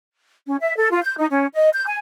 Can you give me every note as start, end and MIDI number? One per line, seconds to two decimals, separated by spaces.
0.47 0.56 61
0.60 0.76 76
0.77 0.89 69
0.91 0.99 65
1.04 1.14 91
1.18 1.26 63
1.30 1.46 61
1.54 1.69 75
1.74 1.84 91
1.87 1.96 80